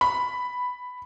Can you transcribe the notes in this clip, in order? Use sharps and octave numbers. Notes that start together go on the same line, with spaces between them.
B5